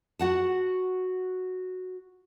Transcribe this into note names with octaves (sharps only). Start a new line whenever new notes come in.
F#4 F#5 A5